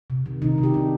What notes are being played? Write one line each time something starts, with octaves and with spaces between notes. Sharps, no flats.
C3
D#3
C3 D#4
C3
G4
D4